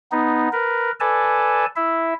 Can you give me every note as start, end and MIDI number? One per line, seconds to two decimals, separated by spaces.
0.12 0.49 59
0.12 0.49 63
0.53 0.91 70
0.53 0.91 71
1.00 1.66 69
1.00 1.66 71
1.00 1.66 74
1.00 1.66 80
1.00 1.66 81
1.76 2.14 64
1.76 2.14 76